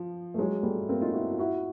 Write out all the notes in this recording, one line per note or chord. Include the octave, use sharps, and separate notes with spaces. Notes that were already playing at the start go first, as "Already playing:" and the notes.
Already playing: F3
A3
F#3 G#3
G3 A3
A#3 C4
D#4 F4
E4 F#4
F4
E4 F#4